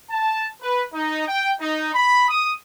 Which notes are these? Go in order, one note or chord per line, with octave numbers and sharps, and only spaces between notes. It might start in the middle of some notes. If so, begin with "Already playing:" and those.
A5
B4
D#4
G5
D#4
B5
D#6